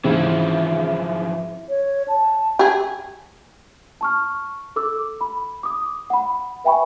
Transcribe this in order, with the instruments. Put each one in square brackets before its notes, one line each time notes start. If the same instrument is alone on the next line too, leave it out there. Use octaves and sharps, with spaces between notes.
[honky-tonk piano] G#2 C#3 [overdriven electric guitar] E3 F3 [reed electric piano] C4 E4 [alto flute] E5
[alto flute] C#5
A5
[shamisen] G4 G#4
[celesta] A5 C#6 F6
A4 D6 E6
B5
D6 D#6
F#5 B5
B4 E5 G5 G#5 B5 C#6